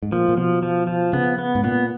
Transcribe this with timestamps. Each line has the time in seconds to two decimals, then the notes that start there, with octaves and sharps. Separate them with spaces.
0.03 G#2
0.12 A#2 F3
0.29 A#2
0.37 B2 F3
0.63 F3
0.87 F3
1.13 C#3 B3
1.39 B3
1.55 G#2
1.63 A#2 B3